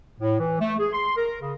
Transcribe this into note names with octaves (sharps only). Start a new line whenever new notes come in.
A2
E3
A3
G#4
C6
A#4
C#3